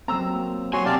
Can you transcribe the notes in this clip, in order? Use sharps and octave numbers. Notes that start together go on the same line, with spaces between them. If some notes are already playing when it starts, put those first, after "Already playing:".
F#3 A#3 C4 A#5 E6
A#3
F#3 C#5 G#5 C6
C3 C4 D5 F5 A5